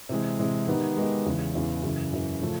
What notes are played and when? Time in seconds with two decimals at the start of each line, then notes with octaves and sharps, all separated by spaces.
0.09 C3 E3 G#3
0.39 C3 E3 G#3
0.67 D#3 G#3 B3 D#4 G4
0.97 D#3 G#3 B3 D#4 G4
1.26 E2 C#3 E3
1.55 E2 C#3 E3
1.84 F#2 C#3 E3
2.12 F#2 C#3 E3
2.42 C#3 F3 A3